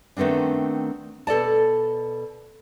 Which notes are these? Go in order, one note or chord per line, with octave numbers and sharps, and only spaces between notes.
D#3 A3 B3 C4 D4
B2 A4 D5 A5